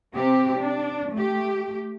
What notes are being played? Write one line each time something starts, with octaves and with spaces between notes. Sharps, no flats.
C3 C4 G4
D4
A3 G4